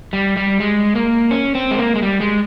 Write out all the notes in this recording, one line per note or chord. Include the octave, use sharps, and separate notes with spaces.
G3
G3
G#3
A#3
C#4
C4
G#3
A#3
G#3
G3
G#3